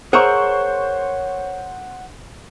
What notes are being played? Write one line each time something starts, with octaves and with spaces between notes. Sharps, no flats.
G#4 A#4 C5 C#5 E5 F#5 C#6